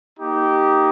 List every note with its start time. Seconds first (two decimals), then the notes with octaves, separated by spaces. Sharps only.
0.18 A#3 D#4 G4